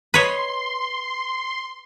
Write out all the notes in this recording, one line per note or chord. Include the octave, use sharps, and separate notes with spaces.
B4 C#5 D#5 C6